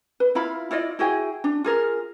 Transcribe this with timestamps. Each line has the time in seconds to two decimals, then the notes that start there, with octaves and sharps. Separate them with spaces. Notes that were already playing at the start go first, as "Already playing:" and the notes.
0.20 B4
0.35 E4 F4 F5 B5
0.71 E4 F4 D5 D#5
0.99 E4 F#4 G#4 G5
1.44 D4
1.64 F4 G#4 A#4